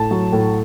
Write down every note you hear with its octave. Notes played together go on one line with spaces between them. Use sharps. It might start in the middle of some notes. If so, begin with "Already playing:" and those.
Already playing: A2 A5
F#3
A2